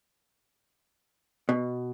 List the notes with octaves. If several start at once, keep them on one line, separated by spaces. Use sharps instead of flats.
B2